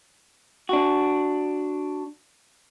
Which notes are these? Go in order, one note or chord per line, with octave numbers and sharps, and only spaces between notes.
D4 F#4